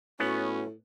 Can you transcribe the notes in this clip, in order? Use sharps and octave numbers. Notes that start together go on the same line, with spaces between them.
A2 B3 C#4 F#4